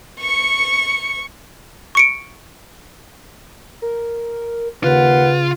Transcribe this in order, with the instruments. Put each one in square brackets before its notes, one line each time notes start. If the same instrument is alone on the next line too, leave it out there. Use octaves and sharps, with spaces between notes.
[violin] C#6 C#7
[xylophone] C#6 C#7 D7
[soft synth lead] A#4
[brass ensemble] D#2 F#5 [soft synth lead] C#3 [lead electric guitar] F4 [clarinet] B4